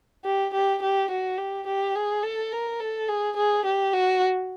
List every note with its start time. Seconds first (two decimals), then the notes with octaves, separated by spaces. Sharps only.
0.25 G4
0.54 G4
0.82 G4
1.11 F#4
1.38 G4
1.67 G4
1.95 G#4
2.23 A4
2.52 A#4
2.80 A4
3.09 G#4
3.37 G#4
3.65 G4
3.93 F#4